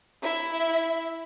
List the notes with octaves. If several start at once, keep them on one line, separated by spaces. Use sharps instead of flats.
E4 E5